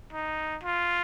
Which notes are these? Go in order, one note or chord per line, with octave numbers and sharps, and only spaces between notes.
D#4
F4